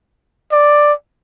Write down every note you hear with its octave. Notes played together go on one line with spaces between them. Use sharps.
D5